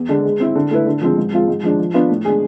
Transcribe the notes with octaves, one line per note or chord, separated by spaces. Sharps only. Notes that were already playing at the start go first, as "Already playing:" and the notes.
Already playing: E2
D3 G#3 D4
G#3
C4 E4
D3
A3 E4 B4
D3
F3 G#3 C4
G#2
F3 G#3 C4 F4
G#2
F3 G#3 D4
F3
B3 D4 F4 B4
A2
G#3 D4 G#4